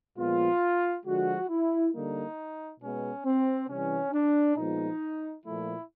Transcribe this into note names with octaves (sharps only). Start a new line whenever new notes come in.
A#2 F3 G#3 B3 F4
D3 F3 G#3 F#4
E4
D3 G3 A#3 D#4
B2 G#3 B3 C#4
C4
C3 E3 G3 C#4
D4
A#2 F3 G#3 B3 D#4
A#2 F3 A3 E4